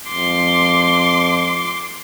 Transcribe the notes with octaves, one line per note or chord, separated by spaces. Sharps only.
F2 C6 D6